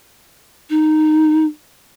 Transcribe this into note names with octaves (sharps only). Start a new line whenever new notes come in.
D#4